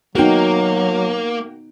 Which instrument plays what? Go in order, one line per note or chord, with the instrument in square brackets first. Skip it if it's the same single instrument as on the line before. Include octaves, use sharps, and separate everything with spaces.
[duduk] F#3 [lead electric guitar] A#3 [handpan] B3 D#4 [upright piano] F#4 G5